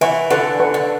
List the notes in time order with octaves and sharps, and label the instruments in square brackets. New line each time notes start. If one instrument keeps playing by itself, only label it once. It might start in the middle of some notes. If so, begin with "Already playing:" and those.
[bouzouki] E3 [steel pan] B4 F#5 C#6
[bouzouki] D3 [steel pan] B4 F#5 C#6
[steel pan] B4 F#5 C#6
[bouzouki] D3